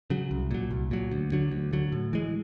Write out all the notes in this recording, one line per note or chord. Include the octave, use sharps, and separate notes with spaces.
C#3 F#3
C2
A#2 F#3
C2
A#2 F#3
D2
D3 F#3
D2
D3 F#3
A2
E3 G#3